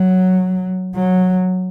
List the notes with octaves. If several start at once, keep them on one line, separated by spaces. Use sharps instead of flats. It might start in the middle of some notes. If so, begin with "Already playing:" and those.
Already playing: F#3
F#3